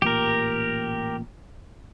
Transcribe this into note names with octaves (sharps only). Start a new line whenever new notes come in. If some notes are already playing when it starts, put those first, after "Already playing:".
A1 A#2 G4 A#4